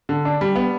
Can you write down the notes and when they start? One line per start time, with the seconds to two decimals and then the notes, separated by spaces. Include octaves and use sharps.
0.09 D3
0.25 D4
0.41 G3
0.56 B3